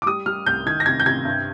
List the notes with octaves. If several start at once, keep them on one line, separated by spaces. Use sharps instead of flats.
D6
G3 D#6
G3 F6
C2 G6
D#3 G#6
A#6
C3 G#6
G6
C3 G#6
G2